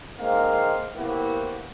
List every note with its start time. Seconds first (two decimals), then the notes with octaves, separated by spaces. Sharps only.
0.19 G#3 A#3 C4 D#4 F5
0.96 C3 A#3 B3 E4 F#4 G4